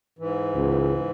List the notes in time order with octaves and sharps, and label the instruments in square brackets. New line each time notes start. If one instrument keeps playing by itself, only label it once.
[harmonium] G#2 E3
[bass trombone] C#2